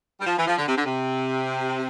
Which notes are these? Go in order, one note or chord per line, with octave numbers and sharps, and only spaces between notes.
G3
F3
E3
F3
D3
C3
D3
C3